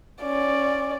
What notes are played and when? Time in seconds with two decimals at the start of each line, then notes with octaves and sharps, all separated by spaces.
0.22 C#4 D5